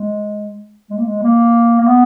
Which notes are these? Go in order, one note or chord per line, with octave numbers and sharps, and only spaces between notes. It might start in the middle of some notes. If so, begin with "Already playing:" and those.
Already playing: G#3
G#3
A#3
G#3
A#3
A#3
B3